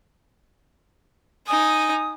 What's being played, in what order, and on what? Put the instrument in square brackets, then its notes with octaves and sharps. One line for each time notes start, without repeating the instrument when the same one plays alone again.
[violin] D#4 G#5 [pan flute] D#6